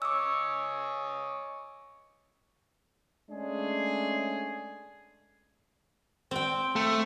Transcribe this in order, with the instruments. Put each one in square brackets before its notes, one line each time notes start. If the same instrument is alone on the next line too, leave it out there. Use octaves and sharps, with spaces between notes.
[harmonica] C#5 D#5 G#5 [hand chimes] D6 E6
[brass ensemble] G#3 A3 C#4 D4 G#4
[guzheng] C4 G5
[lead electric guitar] A3